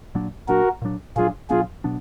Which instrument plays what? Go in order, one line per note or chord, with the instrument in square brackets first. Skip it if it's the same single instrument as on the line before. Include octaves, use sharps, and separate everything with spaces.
[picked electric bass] A#2 F#3 D4
[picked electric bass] A#2 F#3 D4 [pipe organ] F#4 A#4
[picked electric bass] A#2 F#3 D4
[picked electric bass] A#2 F#3 D4 [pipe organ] F4 G#4
[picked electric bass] B2 F#3 B3 D4 [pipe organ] F4 G#4
[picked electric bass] B2 F#3 B3 D4